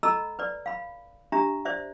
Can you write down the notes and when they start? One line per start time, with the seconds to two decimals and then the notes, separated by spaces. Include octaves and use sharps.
0.03 A4 D#5 A#5 B5 E6
0.39 B4 D5
0.66 F5 B5
1.32 D4 G4 E5 A#5
1.65 C5 D5 E5